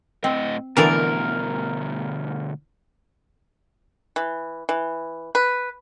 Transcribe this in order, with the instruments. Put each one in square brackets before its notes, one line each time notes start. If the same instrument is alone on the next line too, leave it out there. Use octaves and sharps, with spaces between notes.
[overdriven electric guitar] A2 D#5 [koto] C4
[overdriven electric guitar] D2 B2 [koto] D3 E3 D5 [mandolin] A#4
[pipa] E3
E3
B4